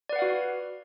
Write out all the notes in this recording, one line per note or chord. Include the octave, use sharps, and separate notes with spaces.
F#4 B4 D5 F5 F#5